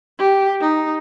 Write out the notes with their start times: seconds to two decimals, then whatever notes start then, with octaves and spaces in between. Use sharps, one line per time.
0.19 G4
0.61 D#4